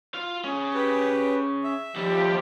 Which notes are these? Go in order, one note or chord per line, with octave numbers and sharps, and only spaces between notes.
F4 F5
C#4 G#4
G4 B4
E5
D#2 F3 G3 G4